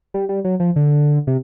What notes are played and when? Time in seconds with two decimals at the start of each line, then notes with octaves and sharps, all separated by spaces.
0.14 G3
0.29 G3
0.44 F#3
0.60 F3
0.76 D3
1.27 C3